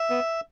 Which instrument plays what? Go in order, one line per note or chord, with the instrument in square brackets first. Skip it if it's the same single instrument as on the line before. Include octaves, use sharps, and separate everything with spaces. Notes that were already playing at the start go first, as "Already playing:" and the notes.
Already playing: [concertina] E5
B3